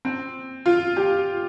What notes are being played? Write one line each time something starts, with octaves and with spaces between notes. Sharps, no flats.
C4
F4
G4